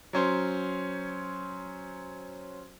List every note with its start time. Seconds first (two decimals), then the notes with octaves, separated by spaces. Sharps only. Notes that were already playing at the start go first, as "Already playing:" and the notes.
0.13 F#3 C#4 C5